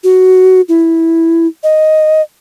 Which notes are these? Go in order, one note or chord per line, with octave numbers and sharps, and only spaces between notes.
F#4
E4
D#5